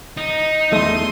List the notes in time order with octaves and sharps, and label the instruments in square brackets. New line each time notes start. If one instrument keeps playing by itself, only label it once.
[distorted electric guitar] D#4
[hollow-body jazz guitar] E2 A3 [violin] C6 D#7